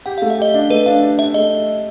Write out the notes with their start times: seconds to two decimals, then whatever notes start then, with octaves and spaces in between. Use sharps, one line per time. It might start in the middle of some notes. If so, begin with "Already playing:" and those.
0.06 G4 F#5
0.18 A3 F5
0.30 E5
0.38 G4 D#5
0.54 D4 D#5
0.70 A3 B4
0.86 D4 F5
1.02 D4
1.19 D4 E5
1.34 A3 D#5